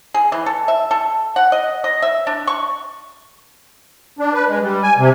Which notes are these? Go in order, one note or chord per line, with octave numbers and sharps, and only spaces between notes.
G#4
E3
A4
E5
A4
F#5
D#5
D#5
E5
D4
C#6
D4
B4
G#3
G3
G#5
C3